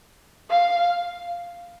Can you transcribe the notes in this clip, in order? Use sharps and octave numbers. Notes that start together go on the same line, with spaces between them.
F5